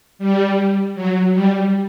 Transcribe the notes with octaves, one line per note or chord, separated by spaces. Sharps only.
G3
F#3
G3